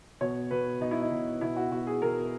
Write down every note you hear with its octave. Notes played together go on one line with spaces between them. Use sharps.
B2 C#5
B2 B4
B2 D#4
E4
D#4
B2
B2 E4
F#4
B2 F#4
G#4
B2 A#4